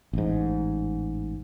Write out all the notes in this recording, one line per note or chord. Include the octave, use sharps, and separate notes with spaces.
A1 G#2